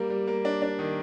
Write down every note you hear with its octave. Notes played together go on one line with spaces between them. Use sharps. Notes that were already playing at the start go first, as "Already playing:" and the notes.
Already playing: G3 A#3
G3
A#3
D4
D4
D#3